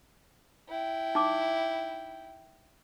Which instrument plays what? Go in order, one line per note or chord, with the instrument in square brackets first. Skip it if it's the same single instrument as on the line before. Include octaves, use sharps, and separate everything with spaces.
[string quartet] E4 G5
[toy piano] D#4 D6